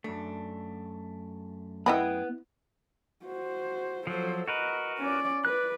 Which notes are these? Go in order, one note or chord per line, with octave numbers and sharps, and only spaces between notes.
F#2 A3 D4
B3 E4 G#4 D#5 F#5 G5 B5
F#4 C5
F3 F#3 A4 C5
F#4 A#4 B4 D#5
C#4 D5
B4 D5 F#6